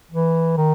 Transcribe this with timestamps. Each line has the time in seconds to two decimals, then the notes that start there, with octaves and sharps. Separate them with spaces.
0.11 E3
0.57 D#3